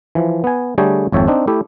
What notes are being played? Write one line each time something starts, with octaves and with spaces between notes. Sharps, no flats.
E3 F3
B3 G#5
D3 G3 A3 G#4 C#5 G5
G#1 F2 C#5 E5 G5 A5
C4 D4 D#4
A3 E4 G4